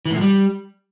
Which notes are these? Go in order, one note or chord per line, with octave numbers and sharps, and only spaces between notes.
E3
A2
F3
G3